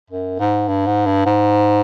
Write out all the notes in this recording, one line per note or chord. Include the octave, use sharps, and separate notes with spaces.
F#2
G#2
G2
G#2
G2
G#2